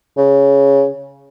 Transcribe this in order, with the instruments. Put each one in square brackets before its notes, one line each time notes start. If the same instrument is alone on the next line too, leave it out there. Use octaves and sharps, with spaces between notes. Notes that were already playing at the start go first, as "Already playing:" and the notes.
[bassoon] C#3